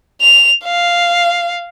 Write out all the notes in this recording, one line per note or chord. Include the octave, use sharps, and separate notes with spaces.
F7
F5